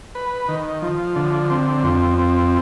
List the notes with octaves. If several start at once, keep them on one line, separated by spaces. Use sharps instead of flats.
B4
D#3
F3
D3
C4
F2
C4